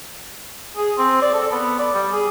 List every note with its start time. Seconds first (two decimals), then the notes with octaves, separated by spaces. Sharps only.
0.77 G#4
0.98 C4
1.22 D5
1.34 A4
1.51 B3
1.79 D5
1.94 G3
2.12 G#4